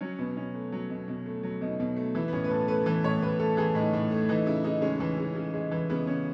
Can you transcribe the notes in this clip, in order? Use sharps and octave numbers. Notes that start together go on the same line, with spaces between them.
F#3 C#4
B2 B3
B2 C#4
A3
F#3
B2
B2
A3
F#3
B2 D#4
B2
A3
E3 E4
B3
A2 C#4
B4
A2 A4
A3 B4
E3 B4
A2 C#5
A2 B4
A3 A4
E3 G#4
A2 D#4
A2
A3
E3 D#4
C#3 E4
C#3 D#4
G#3 C#4
E3
C#3
C#3
G#3
E3
C#3 B3
C#3 C#4